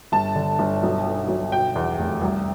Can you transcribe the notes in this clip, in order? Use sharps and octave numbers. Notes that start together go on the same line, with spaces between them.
G1 A5
D3
G1
B1
B2
B1
B2 G5
E2
F1
C2